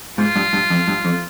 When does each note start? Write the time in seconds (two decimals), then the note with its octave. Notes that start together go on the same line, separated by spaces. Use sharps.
0.18 G#2 F4
0.36 G2
0.53 G2
0.70 F2
0.88 G2
1.05 F2